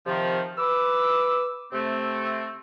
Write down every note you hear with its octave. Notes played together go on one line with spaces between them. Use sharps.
C3 D#3 F3
B4 D6 E6
C3 A3 C4